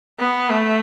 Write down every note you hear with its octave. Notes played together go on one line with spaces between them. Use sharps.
B3
A3